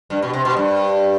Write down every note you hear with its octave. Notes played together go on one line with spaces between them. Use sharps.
G2
B2
C3
B2
G2